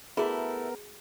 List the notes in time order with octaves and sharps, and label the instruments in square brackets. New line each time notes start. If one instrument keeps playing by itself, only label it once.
[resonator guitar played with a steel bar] A3 E4 [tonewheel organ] B3 A#4 [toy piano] F#4 G#4